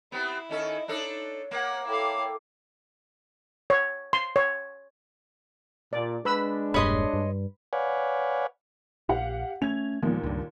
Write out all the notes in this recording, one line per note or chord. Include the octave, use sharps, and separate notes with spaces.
B3 C4 E4 G4
D#3 C#4 A4 D#5
D4 D#4 A4 C#5
A#3 F#5
E4 A4 C#5 F5 G5 D6
C#5
C6
C#5
A#2 D5
G#3 D4 B4 B5 E6
E1 G2 A#2 C#5 D#5 B5 C6
G2
B4 C#5 D5 F5 F#5 G#5
A#1 G4 F5 F#5
A3 C#4 G#6 F7
D#2 A#2 F3 G#3
C#2 G2